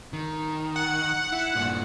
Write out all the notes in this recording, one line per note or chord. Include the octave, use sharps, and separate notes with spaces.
D#3
F#5
E4
G2 A#2